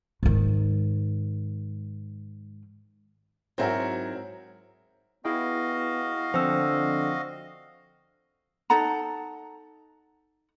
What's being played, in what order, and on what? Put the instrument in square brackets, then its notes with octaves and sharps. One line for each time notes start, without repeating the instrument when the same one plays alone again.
[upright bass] G#2 D#3
[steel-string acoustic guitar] G#2 F#3 [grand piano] C4 E4 A#4
[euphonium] B3 [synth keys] E4 G#4 G5 [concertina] F#4 D#5 F5
[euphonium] D3 [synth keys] F3 C4 [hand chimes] C5 G5 E6
[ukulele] D#4 A4 F#5 A#5